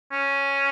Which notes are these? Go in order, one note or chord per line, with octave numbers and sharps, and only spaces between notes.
C#4